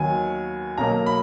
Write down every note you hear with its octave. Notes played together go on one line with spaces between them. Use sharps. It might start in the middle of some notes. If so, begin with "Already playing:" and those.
Already playing: D#2 D#3 F#3 B3 G#5
B1 B2 F#3 A#3 A#5
B5